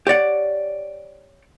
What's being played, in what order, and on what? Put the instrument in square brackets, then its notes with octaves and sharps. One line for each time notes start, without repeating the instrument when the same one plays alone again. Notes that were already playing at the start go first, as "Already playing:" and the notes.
[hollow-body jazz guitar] G4 C#5 D5 F#5